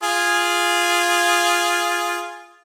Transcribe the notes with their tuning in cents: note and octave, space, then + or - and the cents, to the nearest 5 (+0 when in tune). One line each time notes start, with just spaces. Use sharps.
F4 +0 G#4 +0